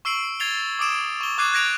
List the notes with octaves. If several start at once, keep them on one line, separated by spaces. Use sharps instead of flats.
C#6 E6 C7 D7 F#7
G#6 A6 C7 F7 G7
D6 D#6 D7 E7
C#6 G7
C#6 D6 F#6 G#6 C7 D#7
F#6 G#6 A#6 D7 F7